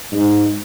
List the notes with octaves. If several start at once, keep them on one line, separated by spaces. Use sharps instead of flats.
G#2